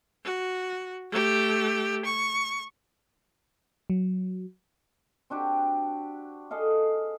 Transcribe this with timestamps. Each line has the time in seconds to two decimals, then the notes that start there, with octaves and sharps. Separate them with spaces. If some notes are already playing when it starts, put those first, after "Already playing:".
0.24 F#4
1.11 A3 G4
2.05 C#6
3.90 F#3
5.30 C4 D4 F#4 G4
6.51 G#4 A4 D#5 F5